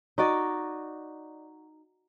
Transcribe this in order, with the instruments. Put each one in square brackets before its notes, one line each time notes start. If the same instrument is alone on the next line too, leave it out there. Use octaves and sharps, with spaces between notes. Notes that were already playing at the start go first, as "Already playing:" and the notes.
[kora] D#4 F#4 D5 D#5